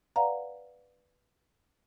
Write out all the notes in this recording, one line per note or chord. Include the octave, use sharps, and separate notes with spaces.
B4 D5 F5 F#5 A#5